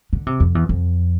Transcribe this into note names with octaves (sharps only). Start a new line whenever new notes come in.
D3
C3
F2
E2
F2